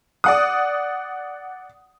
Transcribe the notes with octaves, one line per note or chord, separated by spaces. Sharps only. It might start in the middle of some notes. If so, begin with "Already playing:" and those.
D5 F#5 D#6